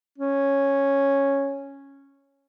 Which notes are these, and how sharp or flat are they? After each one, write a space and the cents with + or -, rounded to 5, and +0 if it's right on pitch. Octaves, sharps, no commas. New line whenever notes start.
C#4 -5